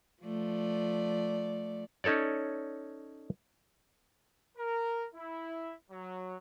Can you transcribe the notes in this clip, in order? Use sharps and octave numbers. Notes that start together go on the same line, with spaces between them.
F3 A3 D5
C#4 D#4 A4 C#5 D5
A#4
E4
F#3